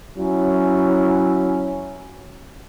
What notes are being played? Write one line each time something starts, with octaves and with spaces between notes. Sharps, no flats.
F#3 C#4 E4